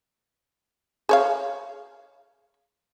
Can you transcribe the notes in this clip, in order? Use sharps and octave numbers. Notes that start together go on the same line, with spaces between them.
G#4 C#5 F5